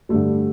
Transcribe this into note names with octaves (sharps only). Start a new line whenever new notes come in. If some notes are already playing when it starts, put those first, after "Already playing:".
G2 D3 G3 A3